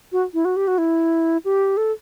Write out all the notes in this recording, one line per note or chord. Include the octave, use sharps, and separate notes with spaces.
F#4
E4
F#4
G4
F#4
E4
G4
A4